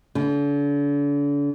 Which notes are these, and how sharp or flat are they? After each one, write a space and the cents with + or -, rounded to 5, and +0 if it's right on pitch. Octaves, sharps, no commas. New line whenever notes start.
D3 -40